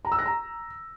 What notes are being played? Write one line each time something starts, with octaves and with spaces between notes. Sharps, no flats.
A#5
E6
A#6
A#5